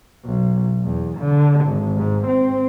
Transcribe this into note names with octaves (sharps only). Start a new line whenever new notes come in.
B1
E2
D3
G#1
G#2
C4